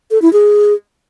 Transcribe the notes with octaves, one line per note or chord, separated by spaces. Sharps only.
A4
E4
G#4